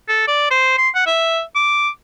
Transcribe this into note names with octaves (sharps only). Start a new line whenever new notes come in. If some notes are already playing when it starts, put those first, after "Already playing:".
A4
D5
C5
C6
F#5
E5
D6